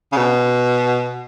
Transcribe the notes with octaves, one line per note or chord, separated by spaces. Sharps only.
C#3
B2